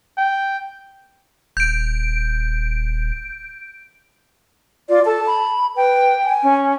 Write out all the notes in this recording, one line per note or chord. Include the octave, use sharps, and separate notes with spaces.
G5
D#1 G6 D7
F4 D5
A4 A5
B5
B4 G5
G#5
C#4